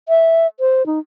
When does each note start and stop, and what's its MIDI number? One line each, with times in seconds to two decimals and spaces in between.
0.09 0.47 76
0.60 0.85 72
0.86 0.99 63